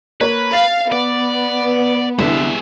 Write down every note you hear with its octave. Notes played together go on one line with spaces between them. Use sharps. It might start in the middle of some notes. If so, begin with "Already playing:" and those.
A#3 A#4 B4 C#5
F5 A6
B3 D5
C2 D3 E3 G#3 E5